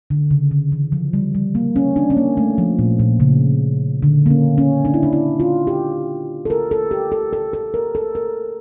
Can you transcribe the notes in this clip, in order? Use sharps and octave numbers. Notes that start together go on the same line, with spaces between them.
D3
C#3
D3
E3
F3
G3
G3
A#3
C#4
D4
C#4
A#3
A3
F3
A#2
A#2
C#3
D3
A#3
C#4
C#4
D4
E4
D4
E4
F4
G4
A4
A#4
A4
G4
A4
A4
A4
A#4
A4
A#4